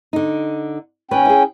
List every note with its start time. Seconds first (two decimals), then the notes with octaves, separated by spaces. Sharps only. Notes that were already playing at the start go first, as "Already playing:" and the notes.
0.13 D3 D#4
1.11 D#2 C#4 B4 C#5 G5
1.25 E4 G#4